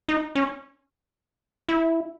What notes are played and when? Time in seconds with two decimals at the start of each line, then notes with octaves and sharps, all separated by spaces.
0.08 D#4
0.35 C#4
1.69 E4